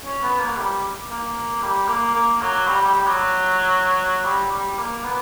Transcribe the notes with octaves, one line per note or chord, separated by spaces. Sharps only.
C#4
B3
A#3
G3
A#3
G3
A#3
A#3
F#3
G3
G3
G3
F#3
G3
G3
A#3
B3